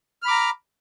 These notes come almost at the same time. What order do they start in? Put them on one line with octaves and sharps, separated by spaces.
F6 B5 D6 A#5